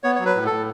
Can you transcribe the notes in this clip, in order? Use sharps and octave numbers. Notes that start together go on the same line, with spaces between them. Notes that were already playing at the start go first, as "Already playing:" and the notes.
B3 C#5
C#5
F#3
B4
A2
A2 A4